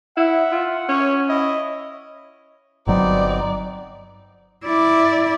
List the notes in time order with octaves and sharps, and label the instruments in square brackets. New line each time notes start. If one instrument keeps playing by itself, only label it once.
[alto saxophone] E4 [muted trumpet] E5 [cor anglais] F#5
[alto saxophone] F4
[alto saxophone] C#4 [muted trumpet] C#5
[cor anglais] E4 [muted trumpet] D#5
[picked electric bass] G1 F#3 [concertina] B3 C4 D#4 [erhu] D5
[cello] E4 D5